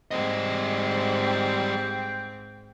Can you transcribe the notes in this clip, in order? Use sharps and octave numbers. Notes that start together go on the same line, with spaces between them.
G#2 G3 C4 D#5
G5